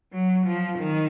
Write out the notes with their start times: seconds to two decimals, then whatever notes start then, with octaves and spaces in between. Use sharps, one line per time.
0.13 F#3
0.45 F3
0.78 D#3